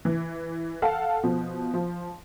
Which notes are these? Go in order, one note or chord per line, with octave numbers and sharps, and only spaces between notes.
E3
A4 F5 F#5 A5
B2 F3
F3